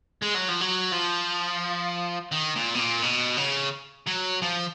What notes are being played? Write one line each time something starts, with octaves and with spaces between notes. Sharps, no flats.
G#3
F#3
F3
F#3
F3
D#3
A#2
B2
A#2
B2
C#3
F#3
F3